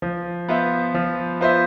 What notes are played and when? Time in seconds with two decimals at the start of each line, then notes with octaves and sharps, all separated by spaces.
0.02 F3
0.48 B3 F4 C5 E5
0.94 F3
1.41 B3 F4 C5 E5